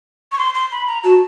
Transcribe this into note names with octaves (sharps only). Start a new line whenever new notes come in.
C#6
C6
C6
B5
A#5
F#4 A5